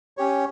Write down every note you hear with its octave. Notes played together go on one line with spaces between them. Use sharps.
C#4 G4 C#5